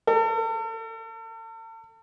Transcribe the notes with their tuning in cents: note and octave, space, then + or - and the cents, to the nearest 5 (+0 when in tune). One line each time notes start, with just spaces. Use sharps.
A4 +40